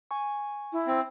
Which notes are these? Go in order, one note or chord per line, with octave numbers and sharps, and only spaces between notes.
G#5 C#6
E4
C4